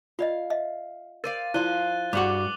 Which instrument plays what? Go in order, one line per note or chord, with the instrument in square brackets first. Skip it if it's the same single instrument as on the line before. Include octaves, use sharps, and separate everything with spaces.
[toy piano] F4 D5 D#5 [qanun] F5
[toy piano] D#5 E5
[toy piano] A#4 [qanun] C5 D5 F5 [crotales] A6 D#7
[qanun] F3 F4 [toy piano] E4 D5 C6 [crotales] F#6 D#7 G7
[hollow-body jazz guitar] G2 F#4 [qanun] G#4 F#5 [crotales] D6 F#7